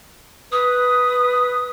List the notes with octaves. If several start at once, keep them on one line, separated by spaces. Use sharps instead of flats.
B4 D#6